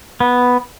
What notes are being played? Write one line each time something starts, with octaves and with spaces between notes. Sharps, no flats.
B3